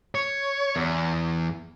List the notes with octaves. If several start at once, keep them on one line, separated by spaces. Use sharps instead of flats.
C#5
E2